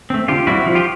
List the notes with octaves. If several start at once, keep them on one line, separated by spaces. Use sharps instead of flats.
A3 C4
D3 F4 G4
G3 C4 E4 F#4
F3
F4 G4